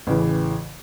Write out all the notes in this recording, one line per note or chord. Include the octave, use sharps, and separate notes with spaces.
A1 C#3 E3